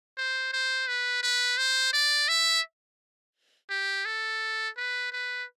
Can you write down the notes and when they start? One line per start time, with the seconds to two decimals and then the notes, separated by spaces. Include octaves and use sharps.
0.17 C5
0.53 C5
0.88 B4
1.23 B4
1.58 C5
1.93 D5
2.28 E5
3.70 G4
4.05 A4
4.77 B4
5.12 B4